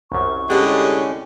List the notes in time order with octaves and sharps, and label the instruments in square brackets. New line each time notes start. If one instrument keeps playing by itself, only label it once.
[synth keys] C2 F#2 [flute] C#6
[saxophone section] A2 D3 G#3 [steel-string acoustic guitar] C#4 G4